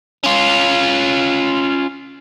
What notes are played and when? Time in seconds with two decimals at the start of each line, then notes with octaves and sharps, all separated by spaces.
0.24 C#4 F4